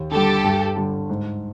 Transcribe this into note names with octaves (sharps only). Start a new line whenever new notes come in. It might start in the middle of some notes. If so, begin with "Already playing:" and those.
Already playing: D#2
D3 G3 G4 A4
G2
D3 G3
G#2